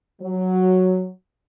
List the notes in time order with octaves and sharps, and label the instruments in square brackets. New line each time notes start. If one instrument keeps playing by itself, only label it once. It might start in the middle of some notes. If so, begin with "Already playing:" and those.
[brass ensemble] F#3